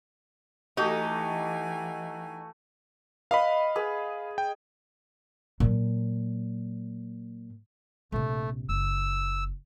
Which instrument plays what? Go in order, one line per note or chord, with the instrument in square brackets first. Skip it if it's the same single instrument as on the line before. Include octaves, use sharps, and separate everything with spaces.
[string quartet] E3 G#5 [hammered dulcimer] A3 F#4 [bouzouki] D#4 G4
[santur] B4 D#5 [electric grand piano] F5 B5
[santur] G#4 B4
[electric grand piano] G5
[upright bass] A#2 F#3
[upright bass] A#1 C3 [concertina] A3
[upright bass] F#1 [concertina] E6